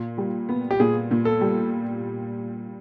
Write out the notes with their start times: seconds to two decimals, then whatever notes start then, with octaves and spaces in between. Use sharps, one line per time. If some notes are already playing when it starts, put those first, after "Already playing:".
Already playing: A#2
0.17 G3
0.49 B3
0.71 G4
0.80 A#2 G#4
1.11 A#2
1.25 A4
1.41 G3